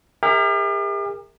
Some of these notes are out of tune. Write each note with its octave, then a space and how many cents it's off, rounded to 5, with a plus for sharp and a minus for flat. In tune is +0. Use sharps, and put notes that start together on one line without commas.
G4 +45 A#4 -15 E5 -25